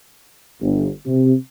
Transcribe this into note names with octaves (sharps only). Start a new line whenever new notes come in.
G1
C3